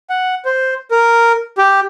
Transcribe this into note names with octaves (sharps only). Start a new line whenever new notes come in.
F#5
C5
A#4
G4